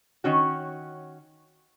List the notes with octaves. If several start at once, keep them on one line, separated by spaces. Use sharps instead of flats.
D#3 C#4 F#4